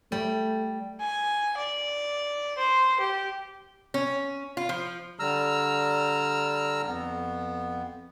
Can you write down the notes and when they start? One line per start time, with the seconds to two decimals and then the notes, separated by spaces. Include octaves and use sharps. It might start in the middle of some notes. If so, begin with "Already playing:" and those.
0.12 G3 A3
1.00 G#5
1.57 D5
2.57 C5
3.00 G4
3.94 C#4
4.57 F4
4.69 F3
5.20 D3 G3 A#5 E6 F6
6.87 F2 B3